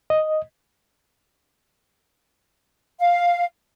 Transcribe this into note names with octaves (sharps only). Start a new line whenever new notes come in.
D#5
F5